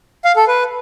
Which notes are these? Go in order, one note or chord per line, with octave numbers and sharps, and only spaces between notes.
F5
A4
B4